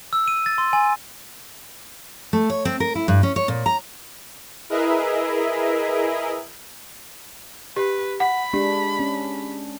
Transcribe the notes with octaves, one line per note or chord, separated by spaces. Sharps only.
E6
D#7
A6
C6
G#5
A3
C#5
C4
A#4
E4
G2
C#4
C#5
A#2
A#5
E4 G#4 A#4 B4 D#5 E5
G4 B4
F#5 B5
G#3 D4 G4
C#4